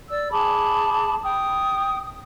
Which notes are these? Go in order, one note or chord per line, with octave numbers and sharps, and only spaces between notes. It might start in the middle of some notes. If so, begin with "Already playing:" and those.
D5 E6
G#4 A5 B5 D6
G5 D#6